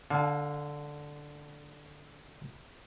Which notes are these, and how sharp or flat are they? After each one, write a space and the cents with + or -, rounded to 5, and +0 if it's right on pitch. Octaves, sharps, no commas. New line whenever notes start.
D3 +0 F5 +25 A5 -35